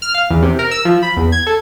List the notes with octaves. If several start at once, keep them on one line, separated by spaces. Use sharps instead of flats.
F6
F5
E2
C3
A#4
E6
F3
B5
E2
G#6
A4